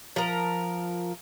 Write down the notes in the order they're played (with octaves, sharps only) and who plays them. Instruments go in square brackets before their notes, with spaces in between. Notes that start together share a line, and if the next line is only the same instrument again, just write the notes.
[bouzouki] F3 A#4